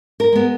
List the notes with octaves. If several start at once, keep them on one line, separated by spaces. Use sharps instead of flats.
A#4
G#3 B3